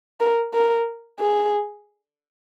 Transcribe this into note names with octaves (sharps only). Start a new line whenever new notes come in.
A#4
A#4
G#4